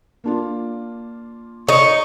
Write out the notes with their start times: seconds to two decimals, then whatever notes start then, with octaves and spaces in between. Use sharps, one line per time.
0.24 A#3 D4 F4
1.68 D#4 C#5 C#6